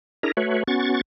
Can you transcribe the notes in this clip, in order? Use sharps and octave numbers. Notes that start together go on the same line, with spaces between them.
D4 E4 G#4 A#4 A#5
A3 F#4 B4 C#5
B3 C#4 F#4 C#6 A6